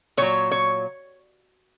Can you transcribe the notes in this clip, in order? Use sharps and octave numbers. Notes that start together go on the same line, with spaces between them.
A#2 F#3 C#5
C#5